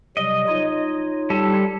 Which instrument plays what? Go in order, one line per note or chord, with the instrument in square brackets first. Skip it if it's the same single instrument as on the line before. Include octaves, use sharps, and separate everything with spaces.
[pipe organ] C3 F#3 G3 [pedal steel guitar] D#5
[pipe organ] D#4 F4 C#5
[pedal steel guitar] G3 A4